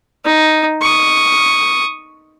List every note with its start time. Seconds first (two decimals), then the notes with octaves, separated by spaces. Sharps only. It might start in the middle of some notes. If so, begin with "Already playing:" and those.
0.25 D#4
0.82 C#6 D#6